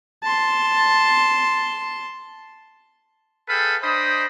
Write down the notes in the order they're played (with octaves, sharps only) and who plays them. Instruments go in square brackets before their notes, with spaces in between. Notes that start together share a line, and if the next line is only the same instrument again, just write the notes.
[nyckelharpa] A5 C6
[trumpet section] G#4 A4 B4 F5 G5 B5
D4 C5 D#5 G5 B5 D#6